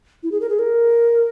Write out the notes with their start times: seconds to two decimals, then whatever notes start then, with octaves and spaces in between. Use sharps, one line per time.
0.23 E4
0.32 G#4
0.41 A#4
0.49 G#4
0.59 A#4